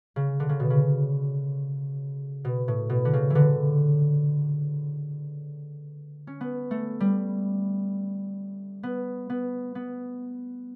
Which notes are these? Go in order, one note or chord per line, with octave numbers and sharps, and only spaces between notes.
C#3
D3
C#3
B2
C#3
B2
A2
B2
D3
C#3
E3
D3
C#4
B3
A3
G3
B3
B3
B3